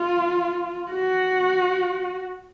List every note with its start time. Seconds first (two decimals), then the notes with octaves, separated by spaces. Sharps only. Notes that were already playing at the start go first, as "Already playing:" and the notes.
Already playing: F4
0.91 F#4